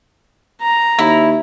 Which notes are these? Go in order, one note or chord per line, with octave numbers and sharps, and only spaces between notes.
A#5
D#2 E4